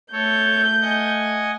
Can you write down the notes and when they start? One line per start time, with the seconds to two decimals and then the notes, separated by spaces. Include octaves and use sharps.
0.13 A3 A4 C#5 G6
0.82 D#5 F#5 G#5